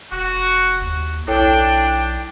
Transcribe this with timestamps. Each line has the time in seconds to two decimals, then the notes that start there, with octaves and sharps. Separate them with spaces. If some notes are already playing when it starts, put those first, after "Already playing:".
0.12 F1 F#4
0.82 D#2
1.27 B1 D4 E4 A4 C#5 G5